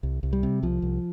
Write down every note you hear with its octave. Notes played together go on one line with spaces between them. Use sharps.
C2
C2
G3
C3
C2 F3
C2